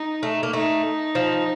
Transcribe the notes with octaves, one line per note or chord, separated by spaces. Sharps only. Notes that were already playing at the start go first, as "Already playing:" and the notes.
Already playing: D#4
A3
A#3
A3 D#4
F3